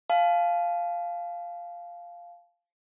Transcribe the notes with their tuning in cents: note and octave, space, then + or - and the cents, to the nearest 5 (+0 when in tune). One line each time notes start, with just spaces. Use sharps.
F5 -5 A5 -35